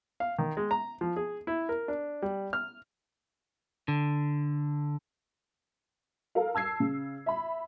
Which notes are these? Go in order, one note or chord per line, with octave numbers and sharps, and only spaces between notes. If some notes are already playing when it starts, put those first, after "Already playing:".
F5
D#3
G#3
A#5
F3
G#4
E4
A#4
D4
G3
F6
D3
A4 A#4 F5
A5 E6 G#6 C7
C#3
E5 B5